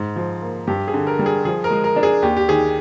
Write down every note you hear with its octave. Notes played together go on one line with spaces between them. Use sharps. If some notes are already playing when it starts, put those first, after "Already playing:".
Already playing: G#2
F3
A#3
G2 G4
G#4
D3
A#4
G3
G#4
F3 G#4
A#4
G#3
A#4
D4
G#4
D#2 G4
G4
D#3 G#4